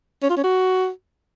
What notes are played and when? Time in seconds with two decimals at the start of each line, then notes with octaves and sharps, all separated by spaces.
0.23 C#4
0.30 F4
0.37 C#4
0.44 F#4